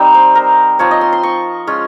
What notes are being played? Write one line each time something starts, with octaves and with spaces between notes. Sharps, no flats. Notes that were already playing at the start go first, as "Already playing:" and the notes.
Already playing: G3 C4 D#4
C5
A#4
F3 C4 F4 C#5
D#5
C6
C6
C#6
G#3 C#4 F4